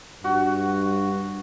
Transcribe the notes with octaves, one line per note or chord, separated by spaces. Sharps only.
G2 F#4